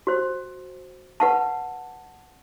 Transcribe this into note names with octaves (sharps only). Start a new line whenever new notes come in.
F#4 C5
B4 F#5 A5